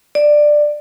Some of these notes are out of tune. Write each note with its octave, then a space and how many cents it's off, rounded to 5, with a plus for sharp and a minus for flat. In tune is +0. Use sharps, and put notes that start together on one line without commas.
D5 +10